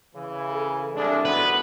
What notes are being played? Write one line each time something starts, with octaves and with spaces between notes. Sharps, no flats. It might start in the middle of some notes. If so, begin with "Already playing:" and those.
C#3 E3
A4 A#4 G#5
C2 G#3 D4 E4
B1 F#2 D3 B3 B4 C5